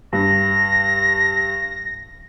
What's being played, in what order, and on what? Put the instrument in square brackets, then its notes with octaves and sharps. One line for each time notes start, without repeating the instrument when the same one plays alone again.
[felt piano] G2 [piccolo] A#6